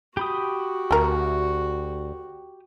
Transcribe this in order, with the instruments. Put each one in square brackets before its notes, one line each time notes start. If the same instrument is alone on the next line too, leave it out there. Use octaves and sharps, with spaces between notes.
[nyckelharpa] F#4 [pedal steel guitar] G4 B5 D#6
[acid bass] D2 [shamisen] A3 A#4